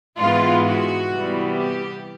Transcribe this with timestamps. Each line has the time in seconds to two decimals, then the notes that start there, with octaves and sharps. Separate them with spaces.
0.18 G#2 E3 G#3 B3 F4
0.65 F#4
1.11 C3 E3 G3 B3
1.57 G4